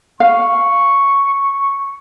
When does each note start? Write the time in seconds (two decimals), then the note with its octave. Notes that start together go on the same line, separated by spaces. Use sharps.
0.20 F5 C#6